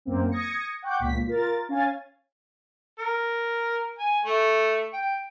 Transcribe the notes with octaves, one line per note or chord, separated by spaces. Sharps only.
F#2 A#3 C4
D#6 G#6 A#6 C#7
F#5 G5 C#6 D6 G6
C#2 A#2 B6
F4 A#4 A6
C#4 F5 G#5 A6
A#4
G#5
A3
G5